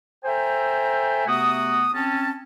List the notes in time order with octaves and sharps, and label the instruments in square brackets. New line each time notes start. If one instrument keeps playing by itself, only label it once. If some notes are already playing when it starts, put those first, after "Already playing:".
[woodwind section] A4 C5 E5 G5 G#5 A#5
C3 A3 B3 F#4 D#6
C4 C#4 A5